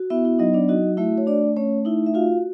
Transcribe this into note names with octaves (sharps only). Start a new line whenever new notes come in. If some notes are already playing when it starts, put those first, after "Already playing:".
Already playing: F#4
B3 E4 E5
E4 E5
F#3 D#4 D#5
D4 D5
D#4 F#4 D#5
A3 E4 E5
C#5
D4 D5
A3 C#4 C#5
D#4 E4 E5
E5
F4 F#4 F5